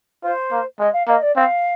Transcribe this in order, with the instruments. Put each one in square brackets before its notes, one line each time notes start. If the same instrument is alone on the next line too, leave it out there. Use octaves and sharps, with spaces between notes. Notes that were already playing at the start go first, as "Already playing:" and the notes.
[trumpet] F4 [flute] C5
[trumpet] A#3
[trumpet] G#3 [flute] D#5
[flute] F5
[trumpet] A#3 [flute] D#5
[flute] D5
[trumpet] C4 [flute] F5